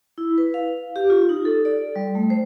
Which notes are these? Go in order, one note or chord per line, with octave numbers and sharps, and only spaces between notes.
E4
B4
F5
G4
F4
D#4
A4
D5
G3
A3
C5